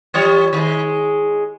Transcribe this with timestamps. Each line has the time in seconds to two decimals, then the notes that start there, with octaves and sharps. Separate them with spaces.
0.14 E3 G3 C#5
0.53 D#3 G#3